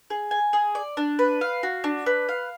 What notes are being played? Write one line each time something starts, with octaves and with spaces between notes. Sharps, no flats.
G#4
G#5
G#4
D5
D4
B4
F5
F#4
D4
B4
F5